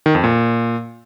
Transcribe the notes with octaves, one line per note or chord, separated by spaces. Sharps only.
D#3
F2
A#2